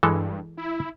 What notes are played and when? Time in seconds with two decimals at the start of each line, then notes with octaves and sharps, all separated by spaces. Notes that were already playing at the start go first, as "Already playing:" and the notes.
0.03 G2 E3 G#3 A4
0.57 E4